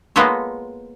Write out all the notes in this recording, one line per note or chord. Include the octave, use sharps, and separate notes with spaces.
G#3 A#3 B3 F4 A4 C#5